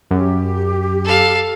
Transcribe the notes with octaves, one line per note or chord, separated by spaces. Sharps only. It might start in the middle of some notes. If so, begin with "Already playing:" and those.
F#2 G4
A4 F5